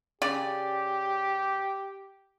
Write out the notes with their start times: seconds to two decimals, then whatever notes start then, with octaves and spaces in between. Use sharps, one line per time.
0.22 C#3 G4 D5